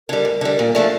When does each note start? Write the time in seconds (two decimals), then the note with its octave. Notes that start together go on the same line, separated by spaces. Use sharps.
0.09 D3 G3 A#4
0.25 D2
0.41 D3 G3
0.58 A#2 A#4
0.75 F3 A3 D4